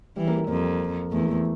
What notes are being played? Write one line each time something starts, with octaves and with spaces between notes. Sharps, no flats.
E3 G3
A#3
A#3
F2 A#3
E2 A3
A#3
A3